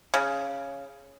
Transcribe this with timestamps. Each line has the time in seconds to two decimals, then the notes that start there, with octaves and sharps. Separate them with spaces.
0.14 C#3